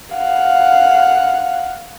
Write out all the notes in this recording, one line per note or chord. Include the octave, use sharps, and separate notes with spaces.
F5 F#5